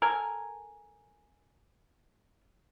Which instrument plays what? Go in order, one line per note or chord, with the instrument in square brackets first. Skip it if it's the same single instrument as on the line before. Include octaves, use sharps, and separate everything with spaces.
[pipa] A4 A#4 G#5